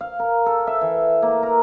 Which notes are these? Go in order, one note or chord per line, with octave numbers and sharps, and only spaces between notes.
F5
A#4
A4
E5
E3
A#3
A#4